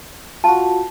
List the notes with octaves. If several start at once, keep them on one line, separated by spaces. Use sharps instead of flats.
F4 F#4 A5